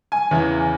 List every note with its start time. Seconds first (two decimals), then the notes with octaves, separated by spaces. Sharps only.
0.12 G#5
0.31 E2 C#3 E3